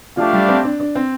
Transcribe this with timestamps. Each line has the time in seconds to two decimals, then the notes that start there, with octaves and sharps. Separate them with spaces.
0.16 F3 A3 D4 G4 D5 F5
0.33 G3
0.48 C4
0.64 D4
0.80 D4
0.95 C4